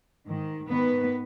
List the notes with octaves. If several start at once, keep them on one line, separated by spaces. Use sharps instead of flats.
G#2 D#3
G#2 D#3 B3 B4